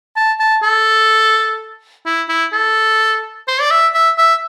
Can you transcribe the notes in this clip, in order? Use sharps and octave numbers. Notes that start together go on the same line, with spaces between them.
A5
A5
A4
E4
E4
A4
C5
D5
E5
E5
E5